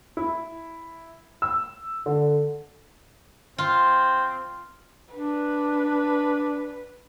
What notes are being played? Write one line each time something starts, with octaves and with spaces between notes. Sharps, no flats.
E4
E6
D3
C4 F4
D4 B4